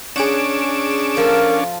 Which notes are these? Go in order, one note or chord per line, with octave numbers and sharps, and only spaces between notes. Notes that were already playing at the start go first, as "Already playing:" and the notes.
C#4 D4 G#4 C#5 F#5 D7 E7
F3 A4 A#4